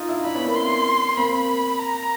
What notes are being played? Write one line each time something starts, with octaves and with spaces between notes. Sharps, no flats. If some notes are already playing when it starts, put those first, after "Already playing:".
Already playing: D#4 F4
D4 E4
D4 E4 B5
B3 C#4
A#3 C4
C6
A#3 C4 B5
A#5